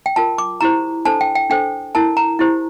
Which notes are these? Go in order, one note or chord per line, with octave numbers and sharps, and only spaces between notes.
G5
F4 A#4 A5
D6
E4 G4 C5 A#5
D4 A4 C5 A5
G5
G5
D4 A4 C5 G5
E4 A#4 A5
A#5
E4 G4 C5